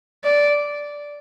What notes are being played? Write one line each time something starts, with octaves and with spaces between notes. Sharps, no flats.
D5